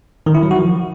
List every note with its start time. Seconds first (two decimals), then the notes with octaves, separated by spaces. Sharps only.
0.26 D#3
0.35 E4
0.43 F#3
0.51 F#4
0.59 F3